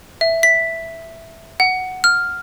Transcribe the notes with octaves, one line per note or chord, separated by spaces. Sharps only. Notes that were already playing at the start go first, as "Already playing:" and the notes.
E5
B6
F#5
F6